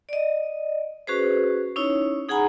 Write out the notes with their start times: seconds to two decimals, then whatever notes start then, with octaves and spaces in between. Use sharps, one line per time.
0.09 D5 D#5
1.07 C#4 F#4 G#4 B4 C5
1.76 C#4 D#4 E4 C#5
2.29 D#4 G#4 F#5 G#5 A#5 B5